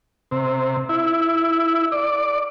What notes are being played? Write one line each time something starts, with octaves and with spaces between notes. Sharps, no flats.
C3
E4
D5